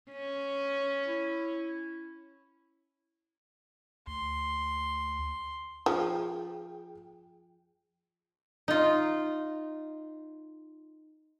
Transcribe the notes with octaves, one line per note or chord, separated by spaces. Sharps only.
C#4
E4
D2 C6
F3 G#4 G5
D#4 F4